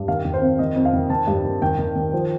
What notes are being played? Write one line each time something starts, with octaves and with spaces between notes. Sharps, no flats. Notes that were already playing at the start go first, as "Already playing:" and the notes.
Already playing: G2
D#3 F5
D#3
C5
F2
D#3 D#5
F2
F5
D#3
D#3 A5
G2
D#3
D#3 G5
D#3
D#3
F3